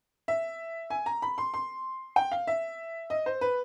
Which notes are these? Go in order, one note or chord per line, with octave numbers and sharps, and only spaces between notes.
E5
G#5
A#5
B5
C6
C6
G5
F5
E5
D#5
C5
B4